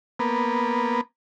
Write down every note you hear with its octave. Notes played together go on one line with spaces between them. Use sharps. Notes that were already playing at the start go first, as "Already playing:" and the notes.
A#3 B3